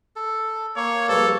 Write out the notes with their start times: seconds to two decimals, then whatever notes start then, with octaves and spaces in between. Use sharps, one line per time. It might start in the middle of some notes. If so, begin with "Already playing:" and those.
0.16 A4
0.76 A#3 C#5
1.08 A#1 G2 A4